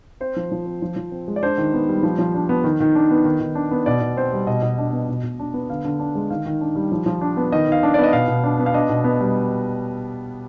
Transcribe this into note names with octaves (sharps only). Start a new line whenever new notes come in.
C4 C5
F3
F3
C4
F3
F3
C4
G#3
D5
D4 C5
D#3
B3
G3
F3
F3
D4
B3
D#3
D#3
D4
B3
D#3
D#3
D4
B3
B2 D5
B2
C4 C5
G3
B2 D#5
B2
D4
B3
B2
B2
D4
B3
D3 F5
D3
D4
G#3
D#3 F5
D#3
D4
G3
F3
F3
D4
B3
D#3 D#5
D#3 F5
D4
B3 D5
D#5
B2 F5
B2
D4
B3
F5
D4 D#5
B2
B3
G3